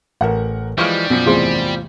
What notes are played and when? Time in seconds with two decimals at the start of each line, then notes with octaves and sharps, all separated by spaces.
0.21 A1 A#4 F#5
0.78 E3 F3 G3 G#3 F5 C#6 F6
1.10 F#2 B2 F3
1.26 A1 E2 C3 F4 G#4 C5